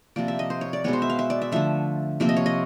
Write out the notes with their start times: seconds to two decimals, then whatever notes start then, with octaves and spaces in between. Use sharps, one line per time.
0.16 C3 F3 A#3 D5
0.28 E5
0.39 D#5
0.50 C5
0.61 C#5
0.73 D5
0.84 B2 G#3 B3 C#5
0.93 C5
1.02 E5
1.10 F5
1.19 E5
1.30 D5
1.42 E5
1.52 D3 F3 A3 E5
2.20 C3 F3 A#3 E5
2.29 D#5
2.37 C#5
2.46 D#5